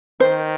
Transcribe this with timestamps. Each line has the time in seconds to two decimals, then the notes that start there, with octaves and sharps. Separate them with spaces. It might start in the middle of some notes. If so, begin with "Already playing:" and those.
0.20 D#3 C5